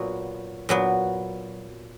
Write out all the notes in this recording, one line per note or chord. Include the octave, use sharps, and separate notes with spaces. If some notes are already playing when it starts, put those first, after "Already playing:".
Already playing: A#2 F#3 B3
A#2 F#3 B3